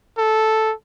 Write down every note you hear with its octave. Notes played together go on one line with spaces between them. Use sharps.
A4